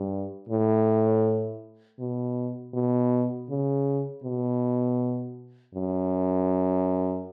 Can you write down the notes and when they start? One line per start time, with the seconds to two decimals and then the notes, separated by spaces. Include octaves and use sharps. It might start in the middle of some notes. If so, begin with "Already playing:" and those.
Already playing: G2
0.49 A2
1.99 B2
2.74 B2
3.50 C#3
4.24 B2
5.75 F#2